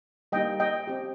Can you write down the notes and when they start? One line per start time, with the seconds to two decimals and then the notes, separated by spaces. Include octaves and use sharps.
0.32 G3 A#3 D#4 G4 D#5 G5
0.60 D#5 G5
0.87 C4 G4